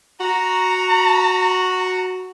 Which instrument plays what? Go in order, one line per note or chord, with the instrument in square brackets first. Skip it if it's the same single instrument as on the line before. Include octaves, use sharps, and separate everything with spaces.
[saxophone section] F#4 [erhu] A#5